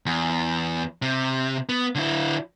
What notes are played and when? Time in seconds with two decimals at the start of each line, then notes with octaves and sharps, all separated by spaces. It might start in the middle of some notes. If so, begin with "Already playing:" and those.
0.06 E2
1.02 C3
1.69 B3
1.95 D3 E4